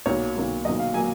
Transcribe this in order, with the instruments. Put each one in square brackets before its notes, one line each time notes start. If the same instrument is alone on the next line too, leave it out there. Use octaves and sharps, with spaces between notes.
[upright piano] B1 A#2 F#3 C#5
B1 A#2 F#3
B1 A#2 F#3 D#5
F5
A#2 F#3 G#5